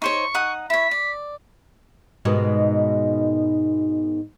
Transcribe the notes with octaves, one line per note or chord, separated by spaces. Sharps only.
D#4 C5 C#5 C#6
D#4 F#5 D#6
E4 C#5 B6
D5
G#2 B2 D#3